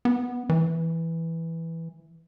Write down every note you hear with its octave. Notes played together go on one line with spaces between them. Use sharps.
B3
E3